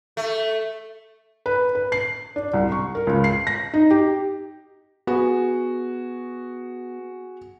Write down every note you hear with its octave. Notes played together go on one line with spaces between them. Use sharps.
A3
B4
B4
C7
D4
C2
C#6
A#4
C#2
C7
A#6
D#4
G4
B3 F#4 G#4